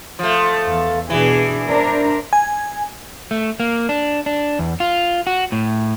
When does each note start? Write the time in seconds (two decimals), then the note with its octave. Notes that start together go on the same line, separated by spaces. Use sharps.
0.19 F3 A3
0.69 E2
1.10 B2 E3 D4 G#4
1.69 D4 A#4 C5
2.33 G#5
3.31 A3
3.60 A#3
3.89 D4
4.26 D4
4.59 E2
4.80 F4
5.27 F#4
5.52 A2